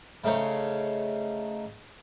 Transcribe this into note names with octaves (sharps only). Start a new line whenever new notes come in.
C#3 A3 D#4 C5 C#5